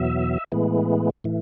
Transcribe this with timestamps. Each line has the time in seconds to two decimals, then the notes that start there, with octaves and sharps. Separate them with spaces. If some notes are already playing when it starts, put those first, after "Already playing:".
Already playing: E2 B2 F#3 E5
0.52 A2 E3 G#3 B3
1.24 A2 E3